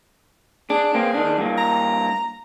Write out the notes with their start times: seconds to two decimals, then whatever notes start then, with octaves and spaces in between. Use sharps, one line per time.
0.70 D4 G#4
0.95 A#3 C4
1.14 D#3 D4
1.38 G2 A#3
1.58 A#5